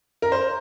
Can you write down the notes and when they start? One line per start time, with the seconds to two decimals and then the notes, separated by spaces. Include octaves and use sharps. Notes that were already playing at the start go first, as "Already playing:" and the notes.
0.22 A#4
0.32 C5